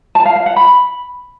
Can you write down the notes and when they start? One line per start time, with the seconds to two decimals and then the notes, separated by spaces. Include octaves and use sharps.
0.15 A5
0.25 F5
0.36 F5
0.46 F#5
0.56 B5